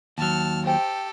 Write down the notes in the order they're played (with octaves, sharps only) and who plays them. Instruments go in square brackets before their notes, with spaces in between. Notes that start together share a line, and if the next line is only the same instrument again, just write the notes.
[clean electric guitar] D#2 F#3 [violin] A5 F6
[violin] G4 A4 [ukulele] C5 G5